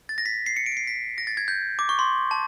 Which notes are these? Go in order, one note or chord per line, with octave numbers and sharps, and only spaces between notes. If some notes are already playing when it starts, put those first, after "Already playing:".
A6
A#6
B6
C7
C#7
D7
C#7
C7
B6
A#6
A6
G#6
G6
D6
C#6
C6
A5